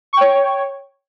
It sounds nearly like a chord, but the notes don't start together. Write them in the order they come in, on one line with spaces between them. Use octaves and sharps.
C#6 G5 C#5